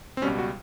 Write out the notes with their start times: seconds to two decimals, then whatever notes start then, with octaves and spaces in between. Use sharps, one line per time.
0.17 C4
0.22 C#2 B2 G3 C#4
0.39 F#4